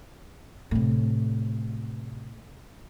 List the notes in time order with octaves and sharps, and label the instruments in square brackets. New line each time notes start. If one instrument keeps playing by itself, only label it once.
[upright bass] A2 C3